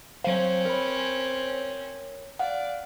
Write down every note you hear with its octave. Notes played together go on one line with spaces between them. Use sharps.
F#3 C4 C#4 C5 F5
A#4 C#5 B5
D5 F5 F#5